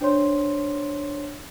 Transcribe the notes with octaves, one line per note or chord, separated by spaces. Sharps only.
D4 C5 C#5 C6